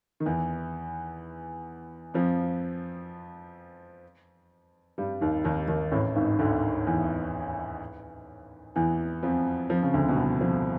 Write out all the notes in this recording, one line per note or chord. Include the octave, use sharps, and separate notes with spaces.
D#3
E2 E3
F2 F3
G2 G3
D#2 D#3
D#2 D#3
D#2 D#3
A1 A2
G#1 G#2
D2 D3
E2 E3
E2 E3
F2 F3
F2 F3
C#3
D2 D3
B2
C2 C3
F2 F3